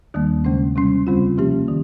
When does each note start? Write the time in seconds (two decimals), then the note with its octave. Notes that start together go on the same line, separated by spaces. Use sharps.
0.14 D#2 D#3 G3 A#3
0.45 C#3 G#3 C#4
0.76 C3 G3 C#4
1.07 F2 C#3 G3 C4 F4
1.37 C3 F3 A#3 C#4 G4
1.68 D#3